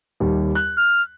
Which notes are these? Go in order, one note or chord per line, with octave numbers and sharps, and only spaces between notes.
D#2 G3
F#6
F6